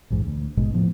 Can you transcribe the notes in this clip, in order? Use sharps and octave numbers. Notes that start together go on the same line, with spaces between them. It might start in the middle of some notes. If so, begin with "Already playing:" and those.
A#1 E2 G#2
D2
A#1 G#2 B2 G#3
D#1 A2 F3 B3